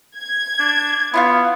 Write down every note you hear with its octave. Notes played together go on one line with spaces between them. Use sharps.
G#6
D4
B3 E4 F4 F5